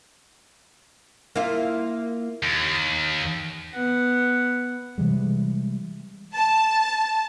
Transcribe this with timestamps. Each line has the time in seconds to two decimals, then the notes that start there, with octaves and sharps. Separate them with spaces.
1.35 A#3 E4 F4
2.43 D#2
3.74 B3 F#5
4.98 C3 E3 G3 G#3
6.35 A5